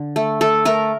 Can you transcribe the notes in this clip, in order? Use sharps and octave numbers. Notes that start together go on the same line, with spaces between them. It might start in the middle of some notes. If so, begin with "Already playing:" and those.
Already playing: D3
A3
A3 A4
A3 A#4